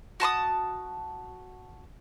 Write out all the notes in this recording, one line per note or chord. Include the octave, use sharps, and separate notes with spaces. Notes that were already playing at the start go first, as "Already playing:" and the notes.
F#4 A5 C6 D#6